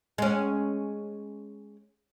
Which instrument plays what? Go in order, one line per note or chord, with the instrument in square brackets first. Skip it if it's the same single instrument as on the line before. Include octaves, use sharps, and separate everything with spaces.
[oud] G#3 C#4